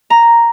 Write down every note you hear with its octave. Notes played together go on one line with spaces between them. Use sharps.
A#5